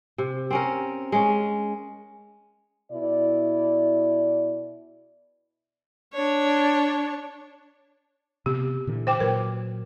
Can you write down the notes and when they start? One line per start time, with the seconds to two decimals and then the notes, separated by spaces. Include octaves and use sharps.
0.18 C3
0.51 C4 C#4 A#4
1.12 G#3 C#4
2.92 B2 E4 D5
6.13 D4 C#5
8.46 C3 B3 G4
8.87 A#2 D3 E3
9.07 C5 G5 D6
9.20 A#2 F#3 A#4 B4